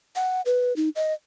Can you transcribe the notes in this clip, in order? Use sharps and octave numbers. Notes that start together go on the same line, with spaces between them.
F#5
B4
D#4
D#5